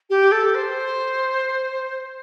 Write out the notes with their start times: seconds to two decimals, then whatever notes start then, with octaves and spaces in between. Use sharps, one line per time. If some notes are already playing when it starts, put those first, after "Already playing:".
0.09 G4
0.31 A4
0.54 C5